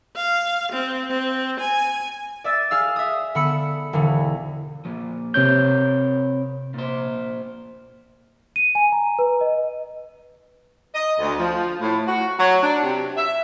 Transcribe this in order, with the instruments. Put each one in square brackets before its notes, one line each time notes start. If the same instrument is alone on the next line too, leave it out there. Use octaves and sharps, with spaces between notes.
[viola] F5
C4
C4
G#5
[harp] D5 E5 E6 A6
G#4 F5 E6
E5 D#6
D3 B3 B5 E6 C#7
E1 D3 E3
[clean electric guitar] A#2 F3
[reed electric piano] C3 G6 [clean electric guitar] C4 A#4 C#5
[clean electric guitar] A#2 C5
[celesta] D#7
G#5
A#5
B4
D#5
[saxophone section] D#5
D2
F3
A2
F#4
F#3
D4
C3
E5